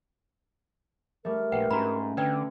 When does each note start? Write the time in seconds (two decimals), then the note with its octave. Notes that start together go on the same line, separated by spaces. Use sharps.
1.25 G3 A3 A#4
1.52 A#1 B4 F#5 G5
1.71 G#2 C#4 F#4 A#5 B5
2.17 D3 B4 D5 G5